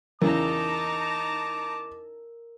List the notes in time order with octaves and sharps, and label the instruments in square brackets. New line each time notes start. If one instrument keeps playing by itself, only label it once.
[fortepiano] E2 C#3 [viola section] D#4 A5 A#5 [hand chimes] A#4 [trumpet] D6